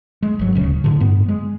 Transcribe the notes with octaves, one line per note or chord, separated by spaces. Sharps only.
G#3
G1 F#3
D1 C#3
A2 D3
G2 B3
G#3